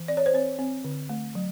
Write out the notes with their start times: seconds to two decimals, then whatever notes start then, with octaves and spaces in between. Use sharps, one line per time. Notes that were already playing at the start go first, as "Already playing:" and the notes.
Already playing: E3
0.08 C4 D5
0.17 C#5
0.26 C5
0.33 C4 C#5
0.59 C4
0.84 D3
1.09 A3
1.35 F#3